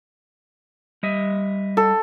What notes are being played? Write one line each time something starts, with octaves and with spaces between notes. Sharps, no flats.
G3 D#5 E5
A4